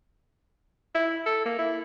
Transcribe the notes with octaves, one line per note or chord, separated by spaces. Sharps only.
E4
A4
A#3
E4